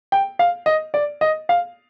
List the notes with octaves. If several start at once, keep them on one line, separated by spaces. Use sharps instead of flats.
G5
F5
D#5
D5
D#5
F5